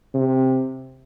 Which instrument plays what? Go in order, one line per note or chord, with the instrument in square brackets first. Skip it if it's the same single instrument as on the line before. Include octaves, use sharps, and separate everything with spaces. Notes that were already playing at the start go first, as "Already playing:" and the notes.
[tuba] C3